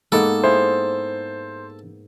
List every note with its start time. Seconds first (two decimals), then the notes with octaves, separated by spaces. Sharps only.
0.12 G#2 A#3 B3 A4
0.44 E4 G#4 C5 F5